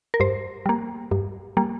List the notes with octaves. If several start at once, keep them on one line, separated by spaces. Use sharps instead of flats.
A#4
G2 C5
G3 A#3
G2
G3 A#3